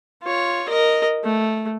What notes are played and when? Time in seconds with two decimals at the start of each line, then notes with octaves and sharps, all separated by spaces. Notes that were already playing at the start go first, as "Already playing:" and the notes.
0.23 F4 C#5
0.69 A#4 D#5
1.24 A3